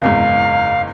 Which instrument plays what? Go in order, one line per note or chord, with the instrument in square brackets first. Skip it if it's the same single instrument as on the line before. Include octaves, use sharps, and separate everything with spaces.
[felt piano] F#1 E2 G#2 [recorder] F5